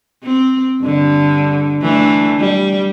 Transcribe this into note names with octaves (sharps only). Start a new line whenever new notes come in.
C4
G2 D3
E3 A3 D4
G3